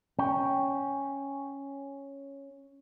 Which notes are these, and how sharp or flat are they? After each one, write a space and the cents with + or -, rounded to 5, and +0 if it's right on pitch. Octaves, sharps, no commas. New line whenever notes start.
C#4 +0 G5 +0